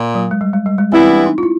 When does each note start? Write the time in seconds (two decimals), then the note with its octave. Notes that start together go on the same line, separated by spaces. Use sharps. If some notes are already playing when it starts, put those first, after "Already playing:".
Already playing: A#2
0.15 F#3
0.31 G#3
0.41 G3
0.53 G#3
0.66 G3
0.78 G#3
0.92 E3 G3 B3 C4 E4
1.09 D4
1.26 D#4
1.38 F4
1.43 E4